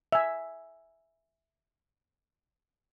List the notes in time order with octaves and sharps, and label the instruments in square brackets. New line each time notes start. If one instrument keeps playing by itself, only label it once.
[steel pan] E5 G#5